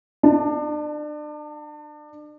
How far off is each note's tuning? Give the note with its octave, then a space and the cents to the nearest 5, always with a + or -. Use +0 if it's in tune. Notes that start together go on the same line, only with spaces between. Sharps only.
D4 +35 A5 +0